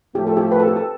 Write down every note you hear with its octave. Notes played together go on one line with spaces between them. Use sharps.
A2 F3 A3 G4
A4
G4
B4
A4
G4
A4